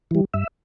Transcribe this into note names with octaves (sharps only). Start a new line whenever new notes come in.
E3 G3
G2 E5